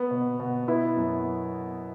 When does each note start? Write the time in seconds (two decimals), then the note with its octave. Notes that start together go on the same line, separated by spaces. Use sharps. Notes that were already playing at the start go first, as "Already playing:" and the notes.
Already playing: B3
0.11 B2
0.40 B2
0.68 B3 E4
0.97 F#2